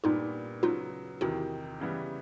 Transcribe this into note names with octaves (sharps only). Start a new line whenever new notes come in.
A#2 G3 B3 D4 D#4 F4
C#3 F#3 B3 D#4 F4
E2 C3 D#3 E4 F#4
C#3 E3 G3 B3